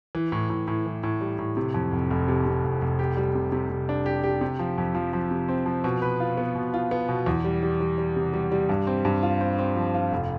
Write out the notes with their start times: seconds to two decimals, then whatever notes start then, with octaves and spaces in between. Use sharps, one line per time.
0.15 E3
0.32 A2
0.50 A2
0.68 A2
0.86 E3
1.03 A2
1.21 G3
1.39 A2
1.57 C3
1.74 F2
1.92 F1
2.10 F1
2.28 C3
2.46 C3
2.64 F1
2.82 F1
2.99 G4
3.17 G3
3.35 C3
3.52 C3
3.70 C3
3.89 D4
4.06 G4
4.23 G4
4.41 C3
4.59 F3
4.78 F2
4.95 F3
5.13 F3
5.31 C3
5.48 C4
5.66 F3
5.84 B2
6.02 B4
6.20 F4
6.37 B3
6.55 B2
6.74 F4
6.91 B3
7.09 B2
7.26 E2
7.45 G3
7.63 G3
7.80 G3
7.98 G3
8.16 C3
8.34 G3
8.52 G3
8.69 G2
8.87 C4
9.05 G2
9.23 F4
9.41 C4
9.59 C4
9.76 F3
9.94 F4
10.12 F1